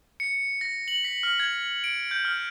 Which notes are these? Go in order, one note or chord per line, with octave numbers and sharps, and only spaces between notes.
C#7
A#6
F#7
B6
F6
G#6
D7
G6
F6